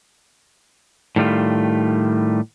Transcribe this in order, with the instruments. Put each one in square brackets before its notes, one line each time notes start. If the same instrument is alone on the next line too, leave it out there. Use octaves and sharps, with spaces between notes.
[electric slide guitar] A2 D#3 G3 A3 F4